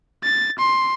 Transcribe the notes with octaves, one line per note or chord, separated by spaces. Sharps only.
A6
C6